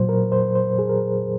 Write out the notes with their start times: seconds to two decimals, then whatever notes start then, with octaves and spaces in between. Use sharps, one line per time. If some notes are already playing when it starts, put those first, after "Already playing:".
Already playing: A#2 F#3 C5
0.09 A#4
0.32 C5
0.55 C5
0.79 G#4
0.89 A#4